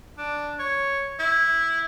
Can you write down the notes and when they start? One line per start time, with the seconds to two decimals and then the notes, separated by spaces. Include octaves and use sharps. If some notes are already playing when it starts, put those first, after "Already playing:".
0.18 D4
0.59 C#5
1.19 E4